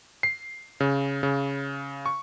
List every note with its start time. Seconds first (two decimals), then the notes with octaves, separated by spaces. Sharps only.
0.23 C7
0.80 C#3
1.23 C#3
2.06 C#6